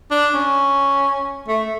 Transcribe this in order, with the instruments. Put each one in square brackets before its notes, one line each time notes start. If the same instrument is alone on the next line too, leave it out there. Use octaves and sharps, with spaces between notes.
[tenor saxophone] D4
C#4
A3